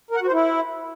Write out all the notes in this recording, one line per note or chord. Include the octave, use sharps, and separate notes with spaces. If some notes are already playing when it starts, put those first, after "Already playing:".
A#4
F#5
F#4
C5
E4